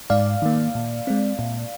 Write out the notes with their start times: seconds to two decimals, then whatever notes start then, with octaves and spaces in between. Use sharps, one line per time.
0.10 G#2 D5 F5
0.42 D#3 A#3
0.75 A#2
1.07 G#3 C4
1.39 A#2